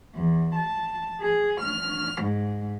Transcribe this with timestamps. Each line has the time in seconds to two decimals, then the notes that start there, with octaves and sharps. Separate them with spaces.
0.15 E2
0.55 A5
1.20 G#4
1.59 F6
2.22 G#2